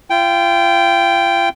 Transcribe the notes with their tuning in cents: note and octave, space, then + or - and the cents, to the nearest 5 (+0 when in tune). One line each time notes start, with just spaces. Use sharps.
F4 -35 G5 +0